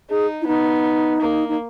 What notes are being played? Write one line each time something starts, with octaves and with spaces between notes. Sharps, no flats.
D#4 G#4
E4
B3 D#4
A#3
D#4